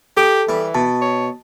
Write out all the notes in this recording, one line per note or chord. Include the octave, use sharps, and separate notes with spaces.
G4 A4 D6
E3 G3
B2 A5
C#5